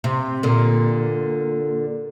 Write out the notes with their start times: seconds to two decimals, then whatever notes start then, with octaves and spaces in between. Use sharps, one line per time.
0.04 C3
0.43 A#2 D3